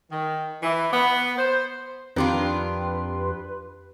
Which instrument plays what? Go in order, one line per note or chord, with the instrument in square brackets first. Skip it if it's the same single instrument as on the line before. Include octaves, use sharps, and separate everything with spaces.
[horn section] D#3
E3
B3
C5
[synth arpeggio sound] F2 G4 C6 [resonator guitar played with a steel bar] D#3 D4 F4 [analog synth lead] B4